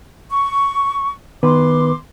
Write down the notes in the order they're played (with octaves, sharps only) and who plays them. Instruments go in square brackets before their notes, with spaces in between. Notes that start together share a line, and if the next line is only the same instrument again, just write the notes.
[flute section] C#6
[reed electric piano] D#3 B3 B4 [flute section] C6 D6